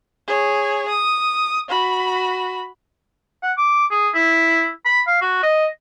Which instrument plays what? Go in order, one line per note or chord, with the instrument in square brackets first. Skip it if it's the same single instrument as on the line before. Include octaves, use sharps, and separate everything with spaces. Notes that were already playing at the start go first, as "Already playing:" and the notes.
[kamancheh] G#4 C#5
D#6
F#4 B5
[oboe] F#5
D6
G#4
E4
B5
F5
F#4
D#5